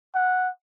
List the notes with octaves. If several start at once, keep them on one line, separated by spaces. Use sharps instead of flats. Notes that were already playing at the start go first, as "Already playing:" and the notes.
F#5